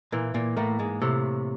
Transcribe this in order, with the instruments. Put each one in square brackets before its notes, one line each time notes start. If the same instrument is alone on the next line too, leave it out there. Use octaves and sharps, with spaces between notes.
[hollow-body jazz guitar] A#2 A#3 [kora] E3
[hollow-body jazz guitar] A#2 A#3
[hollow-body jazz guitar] A2 A3 [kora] A#3
[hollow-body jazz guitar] G#2 G#3
[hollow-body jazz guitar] A2 A3 [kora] C3